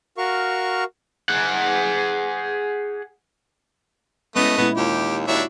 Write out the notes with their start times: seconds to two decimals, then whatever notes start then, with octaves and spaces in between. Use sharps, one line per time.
0.18 F#4 A#4 F5 C#6
1.29 G#4 F#5
4.36 G#3 A3 B3 C#4 E4 D#5
4.58 A#2 G#3 B3 E4
4.77 D#2 F4 G4
5.27 D#2 D4 E4 F#4 C#5 E5